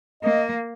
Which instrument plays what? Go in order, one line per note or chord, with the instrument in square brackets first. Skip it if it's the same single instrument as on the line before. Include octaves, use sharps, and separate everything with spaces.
[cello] A#3 [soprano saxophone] D#5